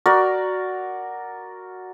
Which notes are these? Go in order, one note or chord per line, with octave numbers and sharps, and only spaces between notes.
F#4 A#4 D5